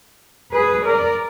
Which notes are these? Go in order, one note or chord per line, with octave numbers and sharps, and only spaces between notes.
G#4 B4
A#4 D5